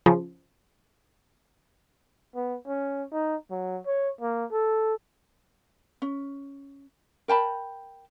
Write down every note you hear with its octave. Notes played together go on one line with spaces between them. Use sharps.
C#3 F3
B3
C#4
D#4
F#3
C#5
A#3
A4
C#4
A#4 G5 A5 B5